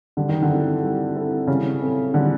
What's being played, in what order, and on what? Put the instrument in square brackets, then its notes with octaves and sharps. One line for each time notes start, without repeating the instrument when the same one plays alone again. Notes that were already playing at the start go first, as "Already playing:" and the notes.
[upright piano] D3 [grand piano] G3
[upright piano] D#3
D3
[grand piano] C4 E4 A4
G3
C4 E4 A4
[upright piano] C#3 [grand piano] G3
[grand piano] C4 E4 A4
[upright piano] D3 [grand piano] G3